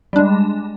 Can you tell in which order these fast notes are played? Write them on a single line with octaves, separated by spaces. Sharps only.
G3 D4 G#3